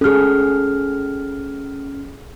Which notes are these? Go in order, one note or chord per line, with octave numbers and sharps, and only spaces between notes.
C#4 G#4 A4 F6